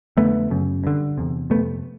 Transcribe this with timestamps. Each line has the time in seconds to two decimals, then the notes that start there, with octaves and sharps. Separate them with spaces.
0.17 F2 D3 A3 B3
0.50 F#2 C#3
0.84 G2 D3
1.18 E2 C3
1.50 F2 C3 A3 B3